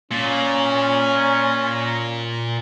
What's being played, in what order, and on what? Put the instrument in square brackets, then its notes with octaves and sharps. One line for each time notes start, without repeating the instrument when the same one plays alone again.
[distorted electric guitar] A#2 [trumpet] C#4